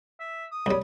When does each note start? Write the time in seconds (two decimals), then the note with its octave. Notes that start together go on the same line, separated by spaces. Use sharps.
0.20 E5
0.52 D#6
0.66 C2 G3 C#5